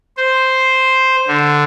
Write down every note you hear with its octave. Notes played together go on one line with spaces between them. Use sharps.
C5
D3